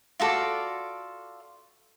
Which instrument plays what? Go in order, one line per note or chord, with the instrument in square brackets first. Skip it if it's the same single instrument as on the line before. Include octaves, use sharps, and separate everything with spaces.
[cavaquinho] F4 F#4 A4 D5